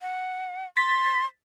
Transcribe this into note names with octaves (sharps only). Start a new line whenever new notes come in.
F#5
C6 A6 B6